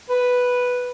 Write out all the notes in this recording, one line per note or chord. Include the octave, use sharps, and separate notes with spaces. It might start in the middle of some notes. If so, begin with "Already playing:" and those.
B4